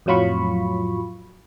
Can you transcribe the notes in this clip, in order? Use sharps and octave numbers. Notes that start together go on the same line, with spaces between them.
F2 A2 F#3 F4 B5 C#6